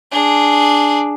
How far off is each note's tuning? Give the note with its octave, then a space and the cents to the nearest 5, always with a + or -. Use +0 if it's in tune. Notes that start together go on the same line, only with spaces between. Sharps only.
D4 +0 G#4 +0